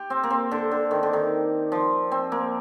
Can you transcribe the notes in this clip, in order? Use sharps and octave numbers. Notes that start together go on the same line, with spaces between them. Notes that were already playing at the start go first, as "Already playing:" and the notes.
Already playing: G4
C4
A#3
C4
D3
D3
D#3
D3
D#3
F3
C4
A#3